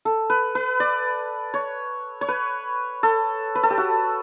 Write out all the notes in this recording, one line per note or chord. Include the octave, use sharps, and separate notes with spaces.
A4
B4
B4
D5
C#5
C#5
B4
A4
B4
A4
G4
F#4